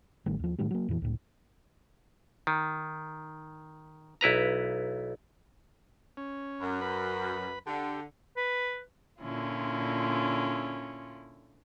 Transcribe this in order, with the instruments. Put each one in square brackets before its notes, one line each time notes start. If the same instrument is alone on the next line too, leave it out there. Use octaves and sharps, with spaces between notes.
[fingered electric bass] A1 D#3 G3 A3
D#2 F3
A2 D#3 G3 A3
F#3 A#3
F2 A#2 E3
C#2 A2
[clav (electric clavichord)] D#3
B1 E4 B4 A#5
[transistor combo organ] C#4
[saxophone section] F#2
[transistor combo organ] B4 B5
[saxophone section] D3 [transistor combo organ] G4
[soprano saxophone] B4
[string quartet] A#2 D3 C#4 E4 F4